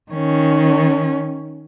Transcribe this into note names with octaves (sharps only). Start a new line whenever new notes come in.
D#3 C#4